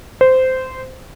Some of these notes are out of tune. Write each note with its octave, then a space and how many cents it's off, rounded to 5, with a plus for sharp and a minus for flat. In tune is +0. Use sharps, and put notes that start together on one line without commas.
C5 -15